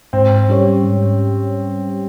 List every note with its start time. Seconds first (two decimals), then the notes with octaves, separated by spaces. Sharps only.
0.13 G#2 C4
0.49 G3 C#4 G4 C#5
0.84 G#2